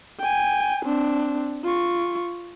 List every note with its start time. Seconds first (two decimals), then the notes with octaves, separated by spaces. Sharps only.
0.20 G5 G#5
0.85 C4 D4
1.65 F4 C#6